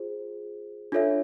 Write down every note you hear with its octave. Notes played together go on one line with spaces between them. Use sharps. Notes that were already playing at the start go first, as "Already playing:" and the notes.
Already playing: F4 G#4 C5
D4 F4 A4 C#5 E5